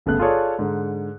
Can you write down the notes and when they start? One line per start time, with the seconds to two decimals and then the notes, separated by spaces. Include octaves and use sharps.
0.06 G1 C#3 A3 B3 F#6
0.19 F4 G#4 A4 C#5 D5
0.59 G#2 D3